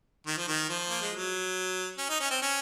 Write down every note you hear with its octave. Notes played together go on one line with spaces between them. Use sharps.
D#3
F3
D#3
F3
A#3
G#3
F#3
C#4
D#4
C#4
C4
C#4